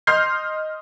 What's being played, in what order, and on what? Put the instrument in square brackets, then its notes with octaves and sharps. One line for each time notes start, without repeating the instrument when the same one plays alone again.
[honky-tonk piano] D#5 C6 F6 G6 C7